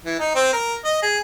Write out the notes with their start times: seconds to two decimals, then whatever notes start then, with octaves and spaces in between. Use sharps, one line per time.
0.05 E3
0.19 D#4
0.35 C4
0.53 A#4
0.85 D#5
1.02 G#4